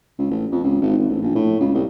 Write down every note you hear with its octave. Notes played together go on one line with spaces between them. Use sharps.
C#2
A1
F2
C#2
G#1
G#1
A1
A#1
A2
C#2
C2